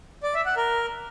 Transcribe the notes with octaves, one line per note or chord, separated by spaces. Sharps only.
D5
E5
F#5
A#4